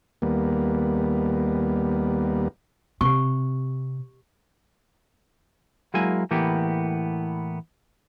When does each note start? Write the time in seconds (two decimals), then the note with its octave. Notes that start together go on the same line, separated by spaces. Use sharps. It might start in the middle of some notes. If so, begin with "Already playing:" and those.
0.22 D#2 G3 A#3 B3
3.01 C3 G4 C#6
5.94 F#3 G#3 A#3 E4 G#5
6.31 A2 E3 A#3 B3 G4